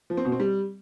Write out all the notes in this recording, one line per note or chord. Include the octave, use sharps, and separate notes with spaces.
F3
C4
B2
C4
G3